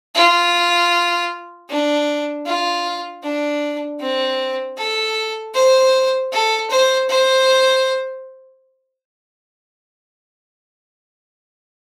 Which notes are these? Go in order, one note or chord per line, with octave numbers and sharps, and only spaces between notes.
F4
D4
F4
D4
C4
A4
C5
A4
C5
C5